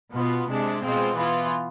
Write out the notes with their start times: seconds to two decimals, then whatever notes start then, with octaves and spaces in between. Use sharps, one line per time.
0.14 B2 B3 F4
0.48 C3 G#3 D4
0.82 B2 G#3 C4 F4
1.14 E3 B3 F4